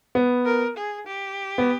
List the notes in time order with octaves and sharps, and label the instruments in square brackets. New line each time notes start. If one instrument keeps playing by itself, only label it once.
[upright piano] B3
[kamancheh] A#4
G#4
G4
[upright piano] B3